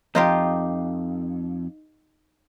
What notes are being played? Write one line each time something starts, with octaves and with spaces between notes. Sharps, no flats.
F2 D#4 F4 G4